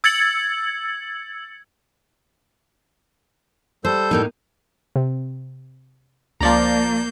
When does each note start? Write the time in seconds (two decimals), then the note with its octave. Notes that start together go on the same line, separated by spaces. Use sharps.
0.04 E6 G#6 A6 C#7 F#7
3.85 G3 A4 C5 G6
4.11 A2 A#3 D#4
4.96 C3
6.41 C#2 F3 A#3 D5 A#5 G6